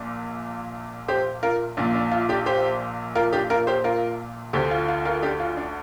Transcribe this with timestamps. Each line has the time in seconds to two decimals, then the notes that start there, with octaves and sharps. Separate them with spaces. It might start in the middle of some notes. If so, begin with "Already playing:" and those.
Already playing: A#1 A#2
1.08 G4 C5
1.43 F4 A#4
1.77 A#1 A#2 D4
1.95 D4
2.12 F4
2.29 D4 G4
2.46 G4 C5
3.15 F4 A#4
3.33 D4 G4
3.50 F4 A#4
3.67 G4 C5
3.84 F4 A#4
4.53 D2 D3 G4 C5
4.71 F4
4.88 F4
5.05 F4 A#4
5.22 D4 G4
5.40 F4
5.57 D4